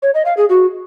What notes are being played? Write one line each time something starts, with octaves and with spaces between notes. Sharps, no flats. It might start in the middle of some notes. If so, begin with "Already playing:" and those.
C#5
D#5
F5
G#4
F#4